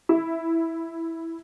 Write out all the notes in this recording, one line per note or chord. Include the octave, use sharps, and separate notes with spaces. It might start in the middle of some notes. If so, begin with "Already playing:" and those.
E4